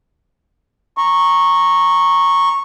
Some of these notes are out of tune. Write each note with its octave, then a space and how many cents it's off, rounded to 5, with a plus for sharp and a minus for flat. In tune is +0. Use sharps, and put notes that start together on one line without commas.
A#5 -5 C#6 -10